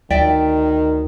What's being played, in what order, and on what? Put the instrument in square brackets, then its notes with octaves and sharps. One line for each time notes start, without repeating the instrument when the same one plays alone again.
[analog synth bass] D2 [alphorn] D#3 [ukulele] D5 E5 G5